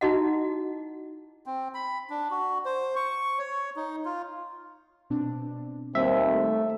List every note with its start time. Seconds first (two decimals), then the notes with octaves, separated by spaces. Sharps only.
0.01 D#4 E4 F#4 D#5 F#5
1.46 C4
1.74 B5
2.10 D4
2.31 F#4
2.65 C5
2.96 C#6
3.39 C#5
3.76 D#4
4.05 F4
5.10 B2 C4 D4
5.95 D#2 G3 C4 E5
6.31 A3